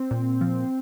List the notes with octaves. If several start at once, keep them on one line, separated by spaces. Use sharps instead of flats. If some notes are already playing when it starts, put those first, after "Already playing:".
Already playing: C4
A#2
F3